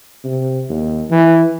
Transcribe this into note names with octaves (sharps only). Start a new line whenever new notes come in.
C3
D#2
E3